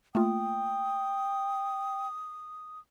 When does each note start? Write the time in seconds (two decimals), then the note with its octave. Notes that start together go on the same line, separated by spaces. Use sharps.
0.15 A3 A#3 F4 G5 D#6